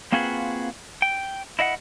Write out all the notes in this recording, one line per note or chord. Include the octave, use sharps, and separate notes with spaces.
A#3 C4 F4 F#4 G#4 B4
G5
E4 D#5 E5 F#5